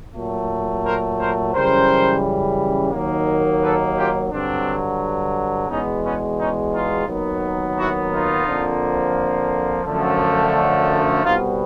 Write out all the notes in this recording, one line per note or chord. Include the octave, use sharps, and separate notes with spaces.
A#2 F#3 A3
A#4 C5
A#4 C5
F#2 C#3 E3 G3 A#4 C5
D#2 D#3 F#3 A#3
A4 B4
F4 G4
G2 D3 F#3 C4 D4
E2 B2 G#3 B3 C#4 D#4
B3 C#4
C#4 D#4
D#4 F4
D#2 D#3 F#3 B3
E4 F#4
D#4 F4
F2 D3 F3 A#3
F#2 D3 F3 A3
C2 B2 G3 B3 D#4 F4